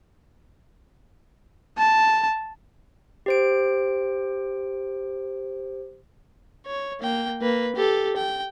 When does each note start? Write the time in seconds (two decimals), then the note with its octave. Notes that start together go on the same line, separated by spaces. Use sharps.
1.78 A5
3.26 G4 C5 D7
6.67 C#5
7.01 A#3 G5
7.42 A#3 B4
7.76 G4 A4
8.16 G5